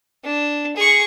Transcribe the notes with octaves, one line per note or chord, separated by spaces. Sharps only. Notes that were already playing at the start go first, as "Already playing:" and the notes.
D4
G#4 C#6